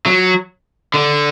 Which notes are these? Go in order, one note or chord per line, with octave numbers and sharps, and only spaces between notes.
F#3
D3